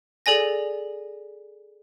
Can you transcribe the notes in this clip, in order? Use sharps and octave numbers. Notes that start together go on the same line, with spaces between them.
G#4 A4 D5 G#5 A#6